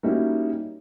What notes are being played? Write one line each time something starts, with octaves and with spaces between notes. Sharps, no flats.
G3 A#3 C#4 D#4 E4 F#4